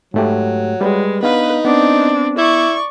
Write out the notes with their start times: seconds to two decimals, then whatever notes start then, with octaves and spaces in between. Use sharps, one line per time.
0.14 G#2 F#3 A3 G4
0.81 G3 G#3 B4
1.23 B3 D4 D#4 B4 F5
1.65 B3 C4 D4
2.38 E4 D5 C#6